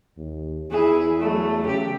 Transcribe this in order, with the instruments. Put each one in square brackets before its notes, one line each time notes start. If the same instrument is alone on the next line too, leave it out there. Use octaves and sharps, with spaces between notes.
[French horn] D#2
[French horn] E2 [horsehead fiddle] E4 G#4
[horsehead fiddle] F#3 A3
[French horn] C#3 [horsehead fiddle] G4